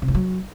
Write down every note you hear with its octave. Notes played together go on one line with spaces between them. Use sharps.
C3
G2
F#3